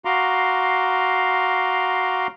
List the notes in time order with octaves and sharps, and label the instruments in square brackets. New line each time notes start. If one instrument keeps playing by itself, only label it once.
[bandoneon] F#4 F5 A#5 C6 D6